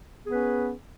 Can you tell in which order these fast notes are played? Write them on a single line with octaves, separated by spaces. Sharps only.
B3 G#4 B4 C#4